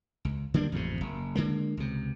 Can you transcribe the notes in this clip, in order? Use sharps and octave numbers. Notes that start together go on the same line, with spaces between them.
C#2
D3 G3 A#3 D4
A1 F2 G#2 C3
F#1
D3 G#3 A#3
C#2 C3